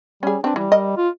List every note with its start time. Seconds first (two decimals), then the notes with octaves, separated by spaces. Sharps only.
0.23 G3 C#4 G#4
0.44 C4 D4 B4
0.56 E3 G3
0.72 A#4 D#5
0.97 F4